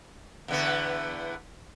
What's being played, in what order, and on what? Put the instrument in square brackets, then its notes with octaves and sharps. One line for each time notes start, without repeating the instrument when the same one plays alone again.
[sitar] E2 D3 B3